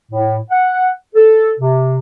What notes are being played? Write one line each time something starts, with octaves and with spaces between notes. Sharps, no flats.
A2
F#5
A4
C3